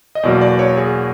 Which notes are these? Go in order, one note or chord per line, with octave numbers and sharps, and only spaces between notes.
D#5
E2 B2 F#3 A#3 D5
D5
C#5
G#4